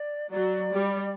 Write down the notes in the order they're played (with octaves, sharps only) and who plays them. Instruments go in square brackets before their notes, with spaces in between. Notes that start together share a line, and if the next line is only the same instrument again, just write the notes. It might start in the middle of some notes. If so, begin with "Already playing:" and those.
Already playing: [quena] D5
[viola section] F#3 [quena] D5
[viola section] G3